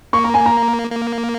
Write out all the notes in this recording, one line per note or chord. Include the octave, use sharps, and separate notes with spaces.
A#3 C#6
A#5
G#5
A#5
A#3